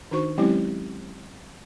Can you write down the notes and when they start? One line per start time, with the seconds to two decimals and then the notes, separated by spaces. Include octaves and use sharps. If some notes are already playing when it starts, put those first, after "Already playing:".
0.11 D#3 D4 D#4 F#4 C5 C#6
0.38 F#3 G#3 C4 C#4 E4 G4